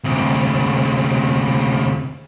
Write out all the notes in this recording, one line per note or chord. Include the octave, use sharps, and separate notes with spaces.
D2 C3